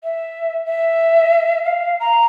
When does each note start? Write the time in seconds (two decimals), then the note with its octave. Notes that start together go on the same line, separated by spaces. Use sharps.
0.04 E5
0.66 E5
1.65 F5
2.00 A#5